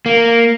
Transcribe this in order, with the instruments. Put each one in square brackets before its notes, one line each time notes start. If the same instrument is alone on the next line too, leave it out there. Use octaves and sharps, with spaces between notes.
[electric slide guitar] A#3